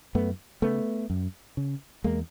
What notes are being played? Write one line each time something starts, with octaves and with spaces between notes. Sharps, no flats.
F#2 A3 B3
C#3 A3 B3
F#2
C#3
E2 G#3 A#3